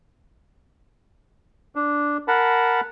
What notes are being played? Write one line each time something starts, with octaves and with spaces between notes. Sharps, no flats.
D4
A#4 F#5 A5 B5